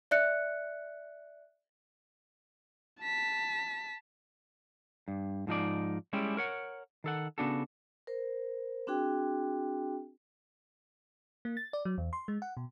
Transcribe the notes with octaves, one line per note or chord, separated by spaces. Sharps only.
D5 E5 F#6 C#7
A5 B6
G2
G#2 F3 D#4 D5
G3 G#3 C#4 E4 G4
A#4 C#5 F#5
D#3 A4 F#5
C#3 B3 D4 F#4 A4
A#4 C5
C4 D4 F#4 G#4 G5
A#3
A6
D5
F#3
E2
C6
G#3
F#5
B2